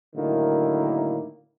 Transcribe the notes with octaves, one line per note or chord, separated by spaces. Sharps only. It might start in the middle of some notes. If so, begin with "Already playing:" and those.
A2 D3 D#3 F#3 A#3 E4